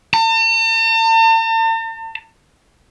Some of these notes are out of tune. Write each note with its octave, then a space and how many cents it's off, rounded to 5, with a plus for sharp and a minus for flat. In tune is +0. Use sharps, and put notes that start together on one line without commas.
A5 +45